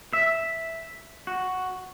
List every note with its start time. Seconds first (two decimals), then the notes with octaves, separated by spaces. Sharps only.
0.13 E5
1.27 F#4